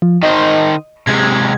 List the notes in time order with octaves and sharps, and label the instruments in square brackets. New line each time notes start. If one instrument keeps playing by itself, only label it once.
[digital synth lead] F3
[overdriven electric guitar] D#3 C5 [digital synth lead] D#5
[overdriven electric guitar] C3 G#3 [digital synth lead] G#6